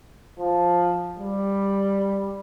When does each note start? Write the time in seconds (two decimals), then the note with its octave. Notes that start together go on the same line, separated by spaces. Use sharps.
0.39 F3
1.19 G3